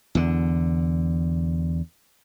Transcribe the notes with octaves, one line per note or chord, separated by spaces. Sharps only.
E2 D3